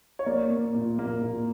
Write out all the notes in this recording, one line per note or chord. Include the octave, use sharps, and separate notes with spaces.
C#5
A#3 D5
A#3
A#2
A#3
A#2